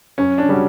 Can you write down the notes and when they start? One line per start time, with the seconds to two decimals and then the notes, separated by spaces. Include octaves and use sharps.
0.18 F#2 C#4
0.38 D4
0.49 C#3 G3 C#4 F#4